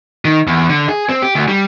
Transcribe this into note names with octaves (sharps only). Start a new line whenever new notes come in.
D#3
E2
D3
G#4
C4
G4
D2
G3